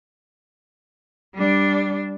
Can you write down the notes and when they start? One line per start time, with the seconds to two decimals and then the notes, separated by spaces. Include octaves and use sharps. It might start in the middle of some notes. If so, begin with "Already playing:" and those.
1.35 G3 D4